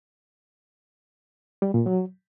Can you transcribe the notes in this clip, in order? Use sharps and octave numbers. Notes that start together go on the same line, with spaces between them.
G3
A#2
F#3